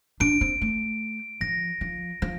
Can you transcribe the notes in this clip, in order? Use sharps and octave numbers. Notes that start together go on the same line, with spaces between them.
D4 D7
C4
A3
F3 A#6
F3
F3